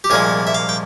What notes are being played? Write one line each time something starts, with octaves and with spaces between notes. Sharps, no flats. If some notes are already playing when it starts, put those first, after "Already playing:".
G4
C2 A#2 F3 G#3 G#4
E5
F5
G5